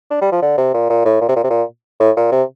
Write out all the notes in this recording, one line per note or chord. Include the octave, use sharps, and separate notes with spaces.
D4
G3
F3
D3
C3
A#2
A#2
A2
A#2
C3
A#2
C3
A#2
A2
A#2
C3